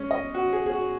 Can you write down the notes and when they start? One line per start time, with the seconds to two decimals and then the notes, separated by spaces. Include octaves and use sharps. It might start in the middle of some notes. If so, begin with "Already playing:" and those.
Already playing: G#3 C#4
0.11 D#5
0.34 F#4
0.53 G#4
0.66 G#4
0.71 F#4